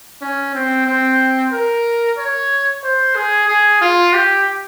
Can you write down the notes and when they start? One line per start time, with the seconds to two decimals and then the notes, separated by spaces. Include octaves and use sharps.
0.22 C#4
0.55 C4
0.87 C4
1.52 A#4
2.18 C#5
2.83 C5
3.15 G#4
3.48 G#4
3.81 F4
4.13 G4